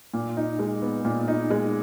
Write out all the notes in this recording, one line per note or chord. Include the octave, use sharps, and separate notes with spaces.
A#2
D#4
G#3
B3
A#2
D#4
G#3